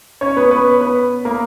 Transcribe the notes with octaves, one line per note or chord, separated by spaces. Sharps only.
C#4 C#5
B3 B4
B3 B4
B3 B4
A#3 A#4